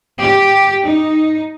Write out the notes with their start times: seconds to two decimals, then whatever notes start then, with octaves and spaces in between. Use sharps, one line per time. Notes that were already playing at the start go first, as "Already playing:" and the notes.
0.19 G4
0.84 D#4